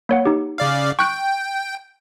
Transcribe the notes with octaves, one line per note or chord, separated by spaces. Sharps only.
A#3 C#5 F#5
D#4 G4
C#3 D5 F5
G5 C#6 F#6 D7